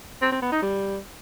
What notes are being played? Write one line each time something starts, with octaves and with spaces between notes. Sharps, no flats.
C4
C4
B3
D#4
G3